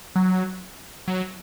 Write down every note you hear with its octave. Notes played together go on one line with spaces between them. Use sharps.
F#3
F#3